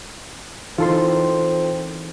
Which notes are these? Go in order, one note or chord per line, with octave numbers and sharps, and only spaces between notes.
E3 C4 D#4 F4 A4 A#4 C6